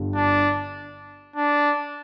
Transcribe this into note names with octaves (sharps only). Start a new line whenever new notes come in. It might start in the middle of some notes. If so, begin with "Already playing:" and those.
Already playing: G1 G2 D3
D4
D4